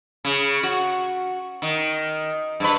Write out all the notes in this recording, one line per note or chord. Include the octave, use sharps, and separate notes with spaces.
C#3
F#4
D#3
G2 B4